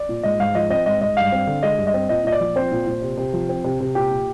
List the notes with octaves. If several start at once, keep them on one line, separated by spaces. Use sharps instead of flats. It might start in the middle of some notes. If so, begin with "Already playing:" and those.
Already playing: D5
A#2
G#2 D#5
G#2 F5
F3 D#5
C4 D#5
G#2 D#5
G#2 D#5
G2 F5
C4
D3
G#3 D#5
G2
D#5
C4
A#2 D#5
A#2 D#5
D5
F3
C4 C5
A#2
A#2
C3
C3
F3
C4
C3
C3
A#2 G4
A#2